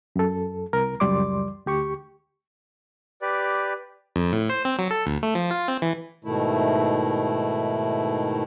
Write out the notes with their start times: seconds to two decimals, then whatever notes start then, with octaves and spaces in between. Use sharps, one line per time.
0.16 F#2 A4
0.73 C2 A#4
1.00 C#2 F#2 G3 D5 C6 D6
1.66 D2 G4 C#6
3.22 G4 B4 D5
4.16 F2
4.32 A2
4.50 C5
4.65 C4
4.79 F#3
4.91 A4
5.06 D2
5.23 A3
5.35 F3
5.51 F4
5.68 C4
5.82 E3
6.25 G#2 B2 D#3 A3 E4